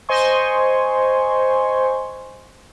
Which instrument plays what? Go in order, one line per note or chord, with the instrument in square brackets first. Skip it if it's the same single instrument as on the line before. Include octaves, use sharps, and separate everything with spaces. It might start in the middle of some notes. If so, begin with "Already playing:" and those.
[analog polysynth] C5 D#5 G#5 C6 C#6